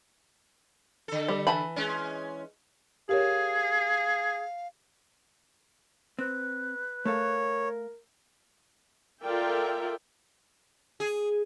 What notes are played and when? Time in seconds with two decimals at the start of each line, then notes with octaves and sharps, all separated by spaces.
1.08 D3 A4
1.28 G3
1.47 E3 A5 B5
1.76 G#3 C#4
3.09 G4 G#4 A#4 C#5 F5
6.19 C4 B4
7.05 A3 A4 A#4 C#5 F5
9.23 F4 A4 A#4 D5 E5 G5
11.00 G#4